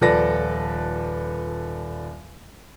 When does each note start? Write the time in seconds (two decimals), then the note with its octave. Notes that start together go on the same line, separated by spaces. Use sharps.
0.01 D#1 F3 A4 B4 D5 A#6